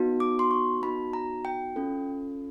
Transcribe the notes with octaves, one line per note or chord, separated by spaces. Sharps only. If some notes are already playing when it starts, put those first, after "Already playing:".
Already playing: B3 D#4 F#4
D6
C6
C#6
B3 D#4 F#4 B5
A#5
G5
C#4 F4 A4